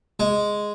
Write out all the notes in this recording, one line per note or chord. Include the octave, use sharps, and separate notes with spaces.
G#3